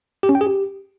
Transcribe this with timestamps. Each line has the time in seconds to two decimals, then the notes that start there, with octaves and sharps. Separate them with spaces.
0.23 G4
0.29 C#4
0.35 G5
0.41 G#4
0.47 G4